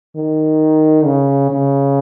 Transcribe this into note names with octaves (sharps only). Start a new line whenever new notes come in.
D#3
C#3
C#3